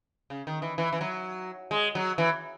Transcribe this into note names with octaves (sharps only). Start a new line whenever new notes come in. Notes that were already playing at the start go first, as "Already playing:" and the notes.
C#3
D#3
E3
E3
E3
F#3
G#3
F#3
E3